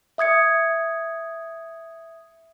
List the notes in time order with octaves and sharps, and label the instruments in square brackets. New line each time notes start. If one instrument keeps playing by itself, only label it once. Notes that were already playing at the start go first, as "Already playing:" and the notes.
[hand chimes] E5 D#6 G#6 C#7